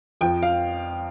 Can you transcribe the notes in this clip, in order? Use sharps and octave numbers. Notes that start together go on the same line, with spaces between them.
F2 F3 G5
F5